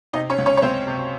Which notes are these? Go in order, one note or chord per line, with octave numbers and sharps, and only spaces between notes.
C3 D#4 D#5
C#4 C#5
C#2
C#4 C#5
C#5
C#2 C4 C5
C3